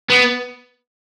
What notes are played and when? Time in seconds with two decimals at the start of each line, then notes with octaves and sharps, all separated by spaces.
0.10 B3